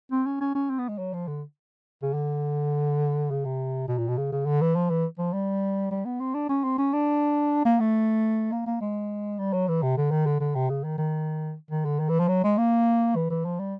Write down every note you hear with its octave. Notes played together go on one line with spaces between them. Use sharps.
C4
C#4
C#4
C#4
C4
B3
G#3
F#3
F3
D3
C#3
D3
C#3
C3
B2
A#2
B2
C#3
C#3
D3
E3
F3
E3
F3
G3
G3
B3
C4
D4
C#4
C4
C#4
D4
A#3
A3
A#3
A#3
G#3
G3
F#3
E3
C3
D3
D#3
D3
D3
C3
C#3
D#3
D#3
D#3
D3
D#3
E3
F3
F#3
G#3
A#3
E3
E3
F3
G3